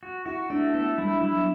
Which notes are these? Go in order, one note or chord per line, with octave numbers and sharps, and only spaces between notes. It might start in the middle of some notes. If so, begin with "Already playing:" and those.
F#4
E4 F#4
A3 D4
B3 A4
G3 E4
F#3 E4